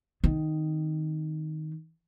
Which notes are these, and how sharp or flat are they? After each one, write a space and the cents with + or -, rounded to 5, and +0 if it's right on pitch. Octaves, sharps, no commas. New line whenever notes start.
D#3 +0 C4 +0